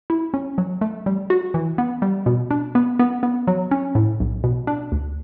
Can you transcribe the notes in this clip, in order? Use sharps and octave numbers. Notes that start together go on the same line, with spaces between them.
E4
C#4
F#3
A3
G3
F#4
E3
B3
G3
B2
D4
B3
B3
B3
F#3
C#4
A2
B1
B2
D4
D2